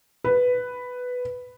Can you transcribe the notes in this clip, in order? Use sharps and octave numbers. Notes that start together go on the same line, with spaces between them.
B4